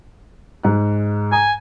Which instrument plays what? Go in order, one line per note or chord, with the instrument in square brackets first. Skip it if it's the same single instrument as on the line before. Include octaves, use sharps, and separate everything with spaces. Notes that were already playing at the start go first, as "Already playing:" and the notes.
[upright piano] G#2 F#6
[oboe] G#5 [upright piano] A#5